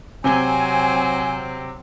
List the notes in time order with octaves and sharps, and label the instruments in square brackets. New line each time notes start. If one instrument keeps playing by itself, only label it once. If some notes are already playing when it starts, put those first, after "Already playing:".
[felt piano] C3 [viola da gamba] F#3 C4 [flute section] G#5